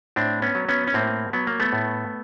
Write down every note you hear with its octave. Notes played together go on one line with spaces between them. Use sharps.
A2 C4 D4
B3 C#4
F#3
B3 C#4
C#4
A2 A#3 C4
F#3 B3
A#3
A3 B3
A2